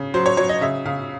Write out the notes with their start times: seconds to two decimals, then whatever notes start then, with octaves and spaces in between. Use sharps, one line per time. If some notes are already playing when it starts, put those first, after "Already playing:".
Already playing: C#3
0.14 F#3 C5
0.26 C#5
0.37 F#3 C#5
0.49 D#5
0.61 C#3 E5
0.85 C#3 F5